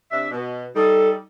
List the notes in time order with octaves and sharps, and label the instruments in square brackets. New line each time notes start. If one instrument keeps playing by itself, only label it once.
[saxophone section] C3 D4 E5
B2
[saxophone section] G3 D#4 [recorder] A4